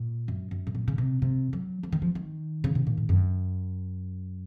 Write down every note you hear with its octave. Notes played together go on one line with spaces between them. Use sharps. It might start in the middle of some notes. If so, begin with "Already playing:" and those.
Already playing: A#2
F#2
F#2
A2
A#2
C#3
C3
C3
F#3
F3
D#3
F3
D#3
C#3
C3
A#2
A2
F#2